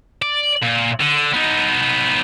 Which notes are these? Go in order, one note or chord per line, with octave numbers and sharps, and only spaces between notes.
D5
A#2
D3
B3 D#4